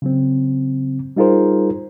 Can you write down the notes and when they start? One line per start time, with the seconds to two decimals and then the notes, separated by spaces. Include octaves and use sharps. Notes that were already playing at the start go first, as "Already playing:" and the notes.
0.02 C#3 F#3 C4
1.17 G3 D#4 F4 G#4 A#4 C5